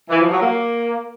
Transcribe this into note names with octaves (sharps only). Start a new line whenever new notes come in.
E3
F3
F#3
A#3